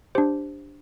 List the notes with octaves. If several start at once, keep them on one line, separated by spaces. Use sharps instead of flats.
D4 G4 C5